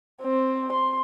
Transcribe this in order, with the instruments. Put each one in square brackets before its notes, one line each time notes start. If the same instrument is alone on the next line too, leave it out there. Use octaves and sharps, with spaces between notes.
[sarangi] C4
C6